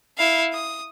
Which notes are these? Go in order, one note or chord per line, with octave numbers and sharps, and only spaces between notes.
E4 F5
D#6